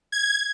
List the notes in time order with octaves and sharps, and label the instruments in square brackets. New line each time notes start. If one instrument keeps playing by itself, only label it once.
[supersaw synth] G#6